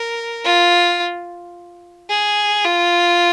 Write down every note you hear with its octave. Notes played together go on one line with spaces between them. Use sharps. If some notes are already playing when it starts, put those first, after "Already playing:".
Already playing: A#4
F4
G#4
F4